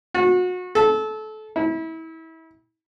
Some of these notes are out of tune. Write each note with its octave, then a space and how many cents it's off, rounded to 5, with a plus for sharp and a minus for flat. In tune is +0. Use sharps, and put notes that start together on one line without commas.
F#4 -30
A4 -25
E4 -30